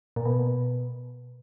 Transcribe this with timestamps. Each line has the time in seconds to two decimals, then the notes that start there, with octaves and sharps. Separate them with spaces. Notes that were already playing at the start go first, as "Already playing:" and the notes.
0.16 A#2
0.25 B2